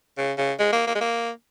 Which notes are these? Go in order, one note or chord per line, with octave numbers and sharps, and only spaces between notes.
C#3
C#3
G#3
A#3
A#3
G#3
A#3